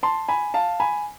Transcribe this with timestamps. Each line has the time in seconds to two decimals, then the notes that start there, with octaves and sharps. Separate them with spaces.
0.03 A5 C6
0.29 G#5 B5
0.54 F5 A5
0.80 G#5 B5